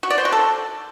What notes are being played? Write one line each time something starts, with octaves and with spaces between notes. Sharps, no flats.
F#4
D5
C5
F#4
A4